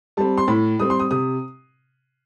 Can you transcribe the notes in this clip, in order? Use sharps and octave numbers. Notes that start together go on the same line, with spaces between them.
G3 C4 A5
C6
A2 B5
G3 C4 D#6
C6
D#6
C3 D#6